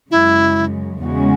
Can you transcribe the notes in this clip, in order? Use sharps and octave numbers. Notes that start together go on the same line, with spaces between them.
F#2 C#3 G#3 E4
E2 C#3 G#3 C#4 F#4